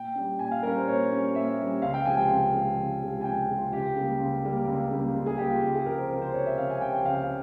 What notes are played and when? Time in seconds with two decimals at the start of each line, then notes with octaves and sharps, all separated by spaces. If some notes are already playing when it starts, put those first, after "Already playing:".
Already playing: A#2 G5
0.15 G3 C#4
0.39 A#2 G#5
0.51 F5
0.63 G3 C#4 A#4
0.76 C5
0.87 A#2 C#5
1.10 G3 C#4
1.34 A#2 E5
1.58 G3 C#4
1.82 C#2 F5
1.94 G5
2.06 C3 F3 G#3 G#5
2.17 G5
2.30 C#2
2.54 C3 F3 G#3
2.78 C#2
3.01 C3 F3 G#3
3.21 G#5
3.24 C#2 G5
3.49 C3 F3 G#3
3.56 F4
3.72 C#2 G4
3.96 C#3 G3 A#3
4.19 C#2
4.44 C#3 G3 A#3
4.67 C#2
4.91 C#3 G3 A#3
5.14 C#2
5.26 G#4
5.38 C#3 G3 A#3 G4
5.50 F4
5.62 C#2 G4
5.75 G#4
5.86 C3 F3 A#4
5.98 C5
6.10 C#2 A#4
6.22 C5
6.33 C3 F3 C#5
6.46 E5
6.57 C#2 F5
6.70 G#5
6.81 C3 F3 G5
6.93 G5
7.05 C#2 F5
7.14 G5
7.23 F5